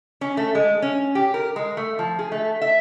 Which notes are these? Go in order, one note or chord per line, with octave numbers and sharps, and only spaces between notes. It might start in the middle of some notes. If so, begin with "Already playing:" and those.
C#4
A3
G#3
C#4
G4
A#4
G#3
A3
F3
G#4
A3
E5